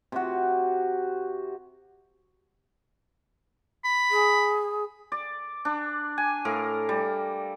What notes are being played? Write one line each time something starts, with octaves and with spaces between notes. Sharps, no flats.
C3 F#4
B5
G#4
D5
D4
G#5
A2 A#4 F5
G3